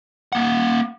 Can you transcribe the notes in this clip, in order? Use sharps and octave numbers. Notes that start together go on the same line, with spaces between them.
A#3 F#5